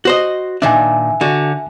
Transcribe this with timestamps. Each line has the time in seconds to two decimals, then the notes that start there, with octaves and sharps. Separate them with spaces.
0.05 F#4 C5 D#5
0.62 A#2 D#3 D4 E5 G#5
1.21 D3 F#4